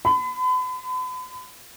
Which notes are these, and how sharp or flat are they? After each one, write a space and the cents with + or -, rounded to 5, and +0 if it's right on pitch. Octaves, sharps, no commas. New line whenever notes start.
B5 +40